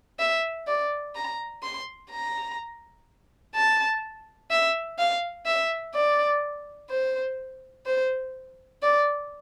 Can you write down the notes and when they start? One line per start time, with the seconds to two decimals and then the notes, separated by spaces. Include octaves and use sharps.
0.19 E5
0.67 D5
1.15 A#5
1.63 C6
2.11 A#5
3.55 A5
4.51 E5
4.99 F5
5.46 E5
5.94 D5
6.90 C5
7.86 C5
8.82 D5